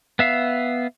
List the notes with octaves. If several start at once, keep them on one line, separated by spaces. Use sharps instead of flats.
B3 E5 F5